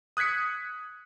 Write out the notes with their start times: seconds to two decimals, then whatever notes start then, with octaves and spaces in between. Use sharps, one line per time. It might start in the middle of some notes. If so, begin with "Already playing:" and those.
0.17 D#6 F#6 G#6 B6 C#7